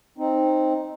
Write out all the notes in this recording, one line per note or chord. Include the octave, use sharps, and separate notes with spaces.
C4 D#4